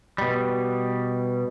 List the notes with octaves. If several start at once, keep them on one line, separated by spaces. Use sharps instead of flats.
B2 G3